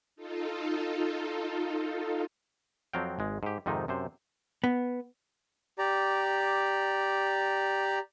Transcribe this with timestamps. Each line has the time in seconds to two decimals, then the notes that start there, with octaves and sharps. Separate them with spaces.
0.16 D#4 F4 A4
2.93 F2 F3 F#3 C4 F5 G5
3.19 G#1 G#3
3.43 G#2 G4
3.66 F2 G#2 C3 D#3 D#4
3.88 F#2 C3 C5
4.64 B3
5.79 G4 D5 A#5